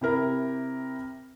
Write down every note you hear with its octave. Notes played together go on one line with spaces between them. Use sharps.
C3 E4 A#4